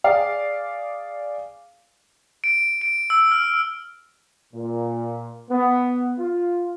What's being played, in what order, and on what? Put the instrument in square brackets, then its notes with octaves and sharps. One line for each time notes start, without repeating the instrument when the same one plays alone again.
[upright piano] G#4 D5 F5
[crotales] D7
D7
E6
F6
[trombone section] A#2
B3
F4